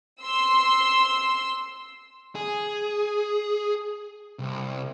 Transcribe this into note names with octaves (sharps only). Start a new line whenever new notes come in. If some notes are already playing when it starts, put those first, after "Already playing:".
C6 E6
G#4
C2